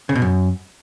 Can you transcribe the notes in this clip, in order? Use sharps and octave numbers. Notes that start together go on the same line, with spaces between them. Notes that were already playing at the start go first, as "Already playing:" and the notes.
C#3
B2
F#2